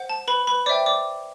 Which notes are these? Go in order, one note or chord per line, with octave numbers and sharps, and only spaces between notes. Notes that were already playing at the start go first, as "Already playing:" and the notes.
Already playing: C5 F#5
A5
B4 B5
B4 B5
C5 D5 E5 G5 D6
D5 D6